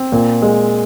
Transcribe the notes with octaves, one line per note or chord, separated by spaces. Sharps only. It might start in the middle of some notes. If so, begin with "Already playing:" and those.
Already playing: C4
A#2
G#3